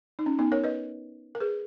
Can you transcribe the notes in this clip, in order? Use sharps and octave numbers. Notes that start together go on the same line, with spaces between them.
D#4
C#4
B3 D#4
A#4 C#5
B4 D#5
A#4
G#4 B4